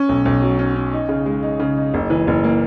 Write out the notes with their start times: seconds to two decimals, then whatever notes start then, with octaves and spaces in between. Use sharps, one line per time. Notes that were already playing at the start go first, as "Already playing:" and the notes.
Already playing: C#4
0.09 B1
0.25 B1
0.42 F#3
0.59 C#4
0.76 C#4
0.93 D#4
1.09 C#3
1.26 G#3
1.43 D#4
1.60 C#3
1.77 D#4
1.94 F#1
2.10 E3
2.27 F#1
2.44 A#3